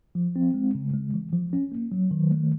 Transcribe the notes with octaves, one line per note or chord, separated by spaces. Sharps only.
F3
C4
G#3
C#3
G#3
E3
F3
C#4
A#3
F#3
D#3
A3